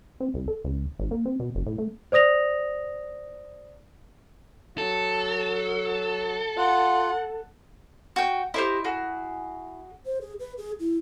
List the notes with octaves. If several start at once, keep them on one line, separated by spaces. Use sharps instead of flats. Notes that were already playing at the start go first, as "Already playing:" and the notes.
C4
C2
A4
C#2
G#1
A#3
C4
B2
F#1
A2
A3
C5 D5 D#6 A#6 F7
F#3 A4
F4 F#5
F#4 G5
E4 G4 C5 D#5
F#4 G#4
C5
G#4
B4
G#4
E4